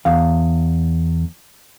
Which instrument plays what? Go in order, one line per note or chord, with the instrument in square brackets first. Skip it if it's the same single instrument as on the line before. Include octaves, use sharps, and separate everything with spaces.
[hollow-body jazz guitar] E2 F5